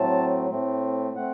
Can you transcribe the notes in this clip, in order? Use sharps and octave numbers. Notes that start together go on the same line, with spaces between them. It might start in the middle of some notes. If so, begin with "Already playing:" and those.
Already playing: A2 F#3 A3 C4 A5
A2 A3 C4
A3 C4 F#5